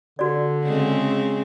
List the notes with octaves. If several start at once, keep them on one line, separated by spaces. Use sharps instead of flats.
D3 F#4 D5
C#3 G#3 C4